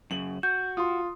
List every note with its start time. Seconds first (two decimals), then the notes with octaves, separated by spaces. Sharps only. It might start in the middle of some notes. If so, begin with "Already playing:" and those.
0.11 F#2 C#3 F#7
0.43 F#4 G6
0.77 F4 C6 D#6